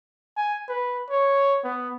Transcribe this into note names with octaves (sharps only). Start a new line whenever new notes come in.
G#5
B4
C#5
B3